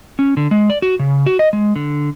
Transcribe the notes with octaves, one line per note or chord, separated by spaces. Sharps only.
C#4
D3
G#3
D5
F#4
C#3
F#4
D#5
G#3
D3